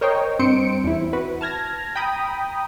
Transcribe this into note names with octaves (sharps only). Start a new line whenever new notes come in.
A#4 C5 C#5 D#5 G5
G2 C4 C5 C#7 D7
E2 E4
F#4 B4
A5 F6 G#6 A#6
G5 A#5 B5 D#6